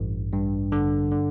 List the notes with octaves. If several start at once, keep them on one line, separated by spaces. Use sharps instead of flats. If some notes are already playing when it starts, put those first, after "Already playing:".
Already playing: A1 G2
G2
D3
D3